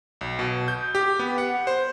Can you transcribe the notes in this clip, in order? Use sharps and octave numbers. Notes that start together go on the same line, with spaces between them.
B1
B2
G6
G4
B3
F#5
C5